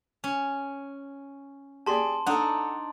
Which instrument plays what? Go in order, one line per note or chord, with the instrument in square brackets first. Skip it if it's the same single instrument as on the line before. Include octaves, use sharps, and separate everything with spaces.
[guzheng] C#4
[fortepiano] G4 G#4 D5 [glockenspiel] A5 C6
[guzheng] D4 D#4 [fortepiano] A4 F#5